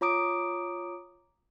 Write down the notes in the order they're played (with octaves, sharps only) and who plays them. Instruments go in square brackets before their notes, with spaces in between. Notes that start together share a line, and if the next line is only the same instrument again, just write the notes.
[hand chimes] F4 C#5 A#5 D6 D#6 D7